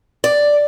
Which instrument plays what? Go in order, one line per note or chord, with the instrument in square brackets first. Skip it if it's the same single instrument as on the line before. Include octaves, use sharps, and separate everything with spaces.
[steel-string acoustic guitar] D5